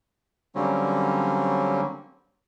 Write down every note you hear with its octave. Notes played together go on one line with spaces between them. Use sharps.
D3 F#3 G3 A#3 C4 C#4